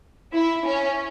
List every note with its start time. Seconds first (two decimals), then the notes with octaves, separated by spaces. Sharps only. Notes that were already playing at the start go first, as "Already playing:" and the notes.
0.33 E4
0.65 C#4